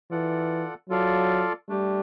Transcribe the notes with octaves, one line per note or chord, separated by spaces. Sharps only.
E3 F4 A4 D5 F#5
F#3 F4 A4 D5 F5
G3 A3 D4 G4